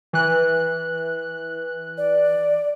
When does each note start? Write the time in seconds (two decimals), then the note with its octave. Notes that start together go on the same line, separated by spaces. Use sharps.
0.13 E3 F#6
1.98 D5